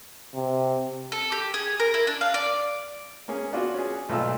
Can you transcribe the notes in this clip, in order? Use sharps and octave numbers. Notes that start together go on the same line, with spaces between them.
C3
A4
G4
G#4
A#4
E4
D4
F5
D5
A#3 C#4 G#4
B3 D4 F4 F#4
C#4 G#4
B1 A#2 A3 F4 A5 E6